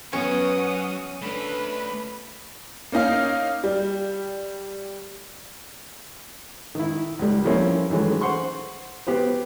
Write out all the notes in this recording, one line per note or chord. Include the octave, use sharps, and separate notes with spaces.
F#3 B3 C#4 F#5 G#5 D#6
A3 D4 B4 B5
A#3 C#4 D#4 F5
G3
D#3 E4
C#2 G3
F3 G3 A#3 C4 C#4 E4
D#3 E3 F#3 G#3 A3
C5 F#5 C6 C#6
B3 G4 B4 C5